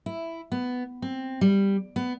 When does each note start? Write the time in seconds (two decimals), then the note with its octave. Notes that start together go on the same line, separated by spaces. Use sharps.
0.06 E4
0.52 B3
1.02 C4
1.41 G3
1.96 B3